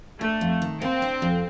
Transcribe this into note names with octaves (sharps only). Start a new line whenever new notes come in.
A3 D4
F2
D#3
A#3 C4
D4
F2